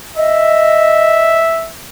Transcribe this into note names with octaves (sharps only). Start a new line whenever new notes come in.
D#5 E5